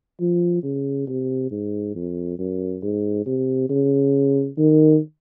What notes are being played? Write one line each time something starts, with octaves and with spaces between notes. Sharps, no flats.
F3
C#3
C3
G#2
F2
F#2
G#2
C3
C#3
D#3